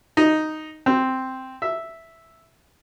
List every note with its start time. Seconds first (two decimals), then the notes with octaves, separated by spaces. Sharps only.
0.17 D#4
0.86 C4
1.62 E5